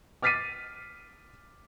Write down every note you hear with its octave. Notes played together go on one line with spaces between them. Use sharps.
D6 F6 A6 B6 C7 D#7